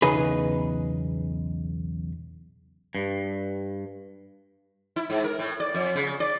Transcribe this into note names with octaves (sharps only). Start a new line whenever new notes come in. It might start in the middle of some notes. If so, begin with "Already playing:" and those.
B1 E2 C#3 D#4 G#4 B4
G2
E4
G#2
A#4
A2
D5
F2
C#3
D5